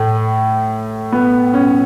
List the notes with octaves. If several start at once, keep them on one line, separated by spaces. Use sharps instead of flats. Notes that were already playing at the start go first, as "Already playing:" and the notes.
Already playing: A2 A3
B3
C#4